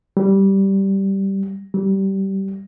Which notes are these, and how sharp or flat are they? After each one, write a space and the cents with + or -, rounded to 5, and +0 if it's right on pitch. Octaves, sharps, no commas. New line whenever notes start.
G3 -10
G3 -20